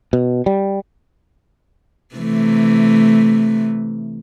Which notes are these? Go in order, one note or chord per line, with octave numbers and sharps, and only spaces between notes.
B2
G3
C3 E3 A3